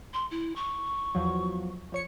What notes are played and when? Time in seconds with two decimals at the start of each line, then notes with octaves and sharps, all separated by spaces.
0.14 C6
0.31 E4
0.56 C#6
1.15 E2 F3 F#3
1.92 F3 C#5 C#7